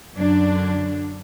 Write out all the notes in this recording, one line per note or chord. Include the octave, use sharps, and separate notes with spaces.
F#2 D3 F#3 D4